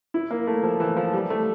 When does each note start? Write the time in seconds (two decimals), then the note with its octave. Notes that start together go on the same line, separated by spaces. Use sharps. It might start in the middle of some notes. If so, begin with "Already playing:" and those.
0.14 E4
0.31 A#3
0.47 A3
0.63 F3
0.80 E3
0.97 F3
1.13 G3
1.30 A3